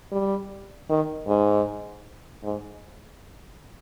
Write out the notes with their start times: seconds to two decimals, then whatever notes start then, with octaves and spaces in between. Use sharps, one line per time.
0.12 G3
0.90 D#3
1.28 G#2
2.44 G#2